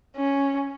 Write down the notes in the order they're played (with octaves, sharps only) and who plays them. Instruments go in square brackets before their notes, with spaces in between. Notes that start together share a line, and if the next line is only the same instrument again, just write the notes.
[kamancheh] C#4